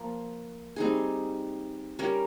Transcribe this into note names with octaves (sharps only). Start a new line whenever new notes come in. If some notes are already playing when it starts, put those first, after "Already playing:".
Already playing: F3 A#3 F4
G3 C4 D#4 G#4
G3 C#4 G4 A#4